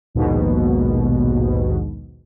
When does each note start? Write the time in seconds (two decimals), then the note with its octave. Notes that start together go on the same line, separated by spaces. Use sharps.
0.15 A#1 D#2 G#2 B2